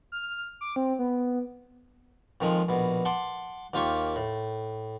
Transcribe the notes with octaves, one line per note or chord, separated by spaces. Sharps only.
F6
D6
C4
B3
F2 D#3 F3 G#3
A#1 B2
F#5 A5 C6 D6
D#2 A#3 F4 G4 C#6
A2